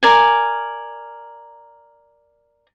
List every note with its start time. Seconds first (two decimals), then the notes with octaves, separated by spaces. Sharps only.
0.03 A#4 D5 G#5